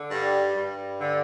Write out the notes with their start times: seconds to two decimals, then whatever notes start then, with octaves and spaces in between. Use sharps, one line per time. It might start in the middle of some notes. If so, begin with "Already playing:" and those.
Already playing: D3
0.10 G2 G3
0.56 G2
1.00 D3